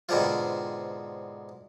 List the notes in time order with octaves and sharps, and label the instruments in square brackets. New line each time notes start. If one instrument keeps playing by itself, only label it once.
[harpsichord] G#2 B2 D3 C4 F4